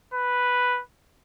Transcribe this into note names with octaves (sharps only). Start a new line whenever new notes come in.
B4